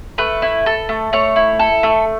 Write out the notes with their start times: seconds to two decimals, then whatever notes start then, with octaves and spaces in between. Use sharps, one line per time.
0.18 A3 B4
0.42 E4
0.66 A4
0.89 A3
1.13 A3 C#5
1.36 E4
1.59 A4
1.83 A3